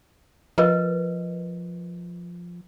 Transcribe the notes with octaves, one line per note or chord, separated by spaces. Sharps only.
F3 A#4 B4 D#5